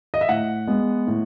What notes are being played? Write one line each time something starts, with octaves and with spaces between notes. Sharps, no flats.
D#5
E5
A2 F#5
G#3 B3
A2